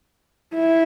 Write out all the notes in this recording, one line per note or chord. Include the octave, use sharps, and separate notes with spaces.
E4